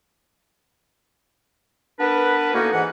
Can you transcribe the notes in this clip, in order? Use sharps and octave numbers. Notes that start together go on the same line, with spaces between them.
B3 D4 A#4 B4
A2 A#3 B3 C#4 D#4 F#4
G#2 E3 B4 F#5